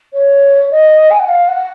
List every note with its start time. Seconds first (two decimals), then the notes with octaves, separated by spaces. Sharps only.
0.13 C#5
0.71 D#5
1.10 G#5
1.19 F#5
1.28 F5
1.48 F#5